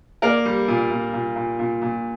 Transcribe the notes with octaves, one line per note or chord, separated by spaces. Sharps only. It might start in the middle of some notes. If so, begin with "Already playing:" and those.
A#3 A#4 D5
G3
A#2
A#2
A#2
A#2
A#2
A#2